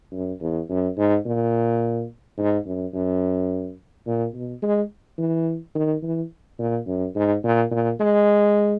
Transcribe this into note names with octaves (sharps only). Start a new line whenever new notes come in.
F#2
E2
F#2
G#2
A#2
G#2
F#2
F#2
A#2
B2
G#3
E3
D#3
E3
A#2
F#2
G#2
A#2
A#2
G#3